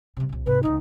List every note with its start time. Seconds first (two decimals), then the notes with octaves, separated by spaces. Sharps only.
0.17 C3 G3
0.29 C2 A#2
0.46 G#2 C3 B4
0.63 C#2 E3 D#4